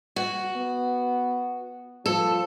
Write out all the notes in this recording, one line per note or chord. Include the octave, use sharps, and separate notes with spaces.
F#4
B3
F3 A4